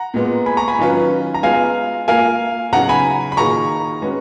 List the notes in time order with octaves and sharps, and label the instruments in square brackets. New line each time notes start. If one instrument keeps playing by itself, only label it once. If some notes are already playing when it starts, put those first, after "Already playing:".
Already playing: [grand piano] F#5 A#5
[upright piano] A#2 G#3 B3
[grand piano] G#5 B5
A#5 C#6
G#5 B5
[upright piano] D#3 F#3 C#4 F4 B4
[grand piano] A#5
[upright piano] G#3 B3 F4 [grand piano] F5 G#5
[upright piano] A#3 F4 A#4 [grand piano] F5 G#5
[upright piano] C#3 F#3 B3 D#4 [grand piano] F#5 A#5
[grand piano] G#5 B5
B5
[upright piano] D#3 A#3 F4 G#4 [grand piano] A#5 C#6
[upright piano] G#3 C#4 F#4 B4